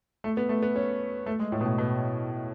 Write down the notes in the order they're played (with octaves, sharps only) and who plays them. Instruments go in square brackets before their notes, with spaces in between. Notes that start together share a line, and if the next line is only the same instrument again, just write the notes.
[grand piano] A3
B3
A3
B3
C#4
A3
G#3
A2
B2
A2
B2